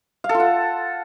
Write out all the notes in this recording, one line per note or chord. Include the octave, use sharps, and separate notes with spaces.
F5
A4
F4
F#5